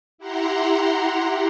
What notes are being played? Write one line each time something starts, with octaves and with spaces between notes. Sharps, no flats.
E4 G4 F#5 A#5 C6